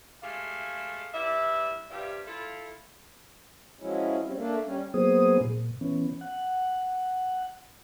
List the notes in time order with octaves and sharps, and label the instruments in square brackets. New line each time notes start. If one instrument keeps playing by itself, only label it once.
[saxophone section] G#3 A3 G4 E5 F5
G2 E4 D5 E5
G2 F3 G3 G4 E5 F5
E4 F4 A4
[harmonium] F3 F#3 G#3 C#4 E4
G3 C4 C#4
A3 A#3 D4
G3 C#4
[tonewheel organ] F#3 A#3 B3 G#4 C5 D#6
A#2
E3 B3 C#4
F#5